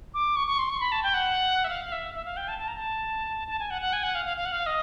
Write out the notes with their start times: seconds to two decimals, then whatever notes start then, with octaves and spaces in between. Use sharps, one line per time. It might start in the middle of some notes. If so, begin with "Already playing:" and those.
0.14 D6
0.36 C#6
0.48 C#6
0.59 C6
0.70 C#6
0.80 B5
0.92 A5
1.03 G5
1.14 F#5
1.64 E5
1.69 F5
1.85 F5
1.92 E5
2.15 E5
2.25 F5
2.37 G5
2.48 A5
2.59 A5
2.68 A#5
2.76 A5
3.48 A5
3.59 G#5
3.70 F#5
3.81 F#5
3.93 G#5
4.03 F#5
4.15 F5
4.26 F5
4.37 F5
4.45 F#5
4.52 F5
4.66 D#5